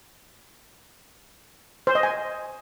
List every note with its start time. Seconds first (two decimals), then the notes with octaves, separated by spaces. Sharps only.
1.87 C5
1.95 D#5
2.03 G#5